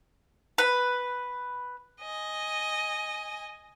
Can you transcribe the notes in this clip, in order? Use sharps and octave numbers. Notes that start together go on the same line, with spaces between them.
B4
D#5 G#5